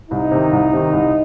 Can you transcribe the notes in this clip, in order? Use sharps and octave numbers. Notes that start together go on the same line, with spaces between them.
C2 D#4
C3 D#3
C2
C3 D#3
C2